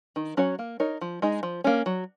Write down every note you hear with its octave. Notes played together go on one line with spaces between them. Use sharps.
D#3
F#3 C#4 F#4 C#5
A#3
D#4 A#4 C#5
F3
G#3 D#4 G#4
F3
A#3 C#4
F#3